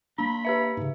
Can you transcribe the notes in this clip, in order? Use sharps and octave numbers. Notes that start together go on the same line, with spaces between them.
A#3 D4 A#5 B5
G4 B4 E5
G#2 C#3